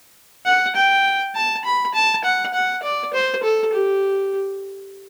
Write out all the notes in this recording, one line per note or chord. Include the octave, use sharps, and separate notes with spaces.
F#5
G5
A5
B5
A5
F#5
F#5
D5
C5
A4
G4